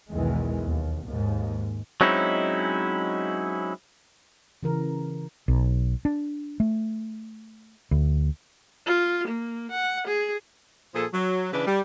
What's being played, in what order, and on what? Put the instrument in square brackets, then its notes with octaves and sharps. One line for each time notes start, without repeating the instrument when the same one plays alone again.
[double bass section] B1 E2 D#3 E3 G#3
D#2
D#2 G#2
[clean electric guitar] F#3 G#3 C4 C#4 D#4 E4
[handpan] C#3 E3 A#4
[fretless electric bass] B1
D4
A3
D2
[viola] F4
A#3
F#5
G#4
[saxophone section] A#2 F3 G#4 A4
F#3
C#3 E3 D4 B4
G3